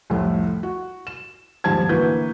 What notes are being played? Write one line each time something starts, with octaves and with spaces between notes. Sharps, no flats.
C2 F2 A2 A3
F#4
E7
D#1 G#2 F3 G3 A5 G#6
D2 E3 A#3 F#4 B4 G6